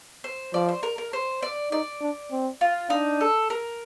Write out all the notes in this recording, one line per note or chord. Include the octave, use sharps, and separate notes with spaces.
C5
F3 D5
C5
A#4
A#4
C5
D5
D#4 D5
D4
C4
F4
D4 D#4
A4
A#4